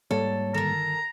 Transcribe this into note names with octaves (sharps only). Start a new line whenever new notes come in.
G#2 G3 A#3 A4 C#5
G1 D#3 A4 A#4 A#5